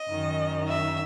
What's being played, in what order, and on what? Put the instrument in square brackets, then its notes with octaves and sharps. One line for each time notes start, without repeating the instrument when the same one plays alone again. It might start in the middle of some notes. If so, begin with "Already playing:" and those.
Already playing: [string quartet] D#5
F#2 D#3
E5